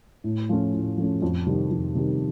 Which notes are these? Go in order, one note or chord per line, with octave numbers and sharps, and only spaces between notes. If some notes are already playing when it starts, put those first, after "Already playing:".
A2
F3 A3 C#4
A2
F3 A3 C#4
F2
C3 D#3 G3
F2
C3 D#3 G3